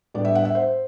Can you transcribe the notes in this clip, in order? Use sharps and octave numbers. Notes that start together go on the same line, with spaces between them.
A2 G3 B3 D4 D5
E5
F#5
E5
C5